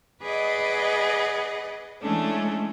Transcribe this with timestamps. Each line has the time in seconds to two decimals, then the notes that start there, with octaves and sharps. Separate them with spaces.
0.22 G#4 B4 D5 D#5 F#5
2.01 E3 G#3 A3 C#4 D4